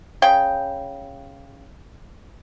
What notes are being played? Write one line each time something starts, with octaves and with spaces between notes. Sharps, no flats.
C#3 G5